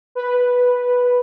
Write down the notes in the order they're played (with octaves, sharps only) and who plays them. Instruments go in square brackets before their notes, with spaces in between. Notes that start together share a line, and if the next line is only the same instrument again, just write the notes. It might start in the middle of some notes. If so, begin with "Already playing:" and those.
[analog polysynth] B4